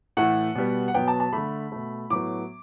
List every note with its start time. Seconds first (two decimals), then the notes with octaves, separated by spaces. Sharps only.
0.17 A2 E3 A3 F#5
0.55 B2 G3 B3
0.88 F#5
0.94 B2 F#3 B3 G5
1.08 A5
1.20 A5
1.33 D3 A3 B5
1.72 B2 A3
2.10 A2 F#3 B3 D6